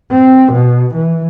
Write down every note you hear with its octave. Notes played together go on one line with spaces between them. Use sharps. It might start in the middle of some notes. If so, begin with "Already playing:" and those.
C4
B2
E3